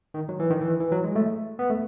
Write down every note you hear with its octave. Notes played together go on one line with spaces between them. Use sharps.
D#3
F#3
E3
D#3
E3
E3
F#3
G#3
A3
B3
A3